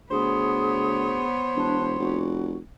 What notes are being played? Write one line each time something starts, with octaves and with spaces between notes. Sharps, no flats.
D2 B3 G#4 C5 C#5
E1 D4
F1 F#4